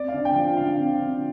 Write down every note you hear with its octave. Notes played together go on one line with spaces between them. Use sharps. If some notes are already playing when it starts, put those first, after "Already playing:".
Already playing: C4 D5
F5
D3
G5
F3
D3 F5
C4
D3